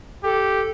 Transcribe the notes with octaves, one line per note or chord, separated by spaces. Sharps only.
G4 A4